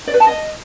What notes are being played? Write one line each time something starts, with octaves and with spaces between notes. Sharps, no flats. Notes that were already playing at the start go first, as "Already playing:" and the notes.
D5
B4
A5
D#5